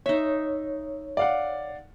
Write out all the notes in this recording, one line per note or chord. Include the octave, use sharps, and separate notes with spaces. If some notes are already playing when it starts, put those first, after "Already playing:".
D#4 C#5 E5
D5 F5 F#5